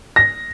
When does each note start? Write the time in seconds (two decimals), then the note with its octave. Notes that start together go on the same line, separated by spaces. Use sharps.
0.16 A#6